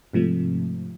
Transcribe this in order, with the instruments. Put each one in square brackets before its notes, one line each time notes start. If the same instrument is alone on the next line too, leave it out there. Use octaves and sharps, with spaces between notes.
[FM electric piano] G#2 C3 F3 A3